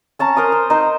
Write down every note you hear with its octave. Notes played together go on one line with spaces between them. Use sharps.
C#4 A5 A#5
A#4 C5 D#6
C5
D#4 C5